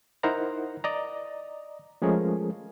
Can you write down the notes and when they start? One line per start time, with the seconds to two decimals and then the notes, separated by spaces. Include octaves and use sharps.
0.23 D#4 E4 A#4 C5 F#5 A#5
0.84 D5 D#5 A#5
2.02 F3 G#3 A3 C#4 G#4 A#4